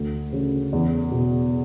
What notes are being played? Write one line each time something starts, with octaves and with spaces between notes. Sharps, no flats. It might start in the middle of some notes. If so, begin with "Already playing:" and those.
Already playing: D2
C#3
E2
B2